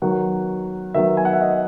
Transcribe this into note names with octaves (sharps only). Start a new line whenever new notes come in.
D#3 F#3 B3 F#5
D#3 F#3 B3 E5
G#5
F#5
E5
D#5